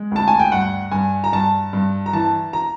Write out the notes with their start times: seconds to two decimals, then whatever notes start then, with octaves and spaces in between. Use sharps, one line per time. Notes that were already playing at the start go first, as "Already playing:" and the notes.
Already playing: G#3
0.11 D2 A5
0.28 G#5
0.39 G5
0.52 G2 F#5
0.91 G2 G#5
1.24 A#5
1.32 G2 A5
1.73 G2
2.06 A#5
2.13 E3 A5
2.53 A#5